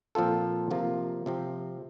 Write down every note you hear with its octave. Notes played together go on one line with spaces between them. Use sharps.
A#2 F3 C4 F4 A4
C3 F3 A#3 F4
C3 F3 C4